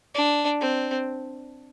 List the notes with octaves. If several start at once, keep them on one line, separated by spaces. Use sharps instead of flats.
D4
C4